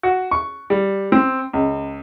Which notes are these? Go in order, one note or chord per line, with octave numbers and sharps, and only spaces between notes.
F#4
C#6
G3
C4
C#2